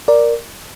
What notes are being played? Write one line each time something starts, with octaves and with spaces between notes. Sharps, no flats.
A#4 D5